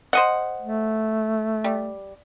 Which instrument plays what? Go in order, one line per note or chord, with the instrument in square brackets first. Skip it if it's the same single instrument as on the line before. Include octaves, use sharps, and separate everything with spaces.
[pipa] C5 D#5 F#5
[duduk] A3
[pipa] G3